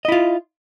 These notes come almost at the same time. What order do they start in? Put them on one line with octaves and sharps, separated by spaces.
D#5 E4 F4